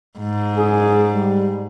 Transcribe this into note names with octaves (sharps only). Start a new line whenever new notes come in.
G#2
F#1 G#4
G3